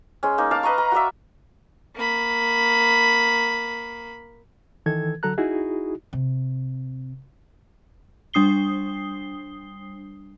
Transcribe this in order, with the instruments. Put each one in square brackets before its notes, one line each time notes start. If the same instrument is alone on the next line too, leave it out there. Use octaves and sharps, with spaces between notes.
[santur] G#3 C#4
A#3 D#4
F5 A5 D6
B4 D#5 A#5 C#6
A#5
F#4 A#4 D5 E5
[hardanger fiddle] A#3 B5
[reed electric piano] D#3 E3 A4 G#6
D3 F#3 A4 A#5 F#6
D#4 E4 F#4 G#4
[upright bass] C3
[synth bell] G3 D4 D#6 C7 G7